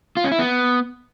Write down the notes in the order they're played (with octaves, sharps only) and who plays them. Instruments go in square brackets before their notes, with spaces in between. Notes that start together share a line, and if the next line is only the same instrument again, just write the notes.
[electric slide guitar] F4
C#4
E4
B3